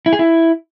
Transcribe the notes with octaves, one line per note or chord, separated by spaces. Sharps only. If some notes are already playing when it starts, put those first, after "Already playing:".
E4
G#4
E4